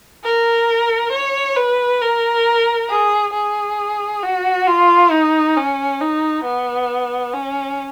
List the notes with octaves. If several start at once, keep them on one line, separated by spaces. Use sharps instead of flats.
A#4
C#5
B4
A#4
G#4
G#4
F#4
F4
D#4
C#4
D#4
B3
C#4